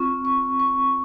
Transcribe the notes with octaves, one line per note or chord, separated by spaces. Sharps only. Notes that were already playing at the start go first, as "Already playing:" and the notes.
Already playing: C4 F4 C#6
C#6
C#6